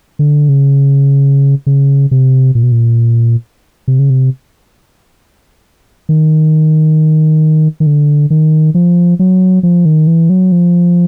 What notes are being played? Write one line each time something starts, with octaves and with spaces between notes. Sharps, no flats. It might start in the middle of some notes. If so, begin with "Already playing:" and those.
D3
C#3
C#3
C3
A#2
B2
A#2
C3
C#3
C3
D#3
D#3
D3
D#3
F3
F#3
F3
D#3
E3
F#3
F3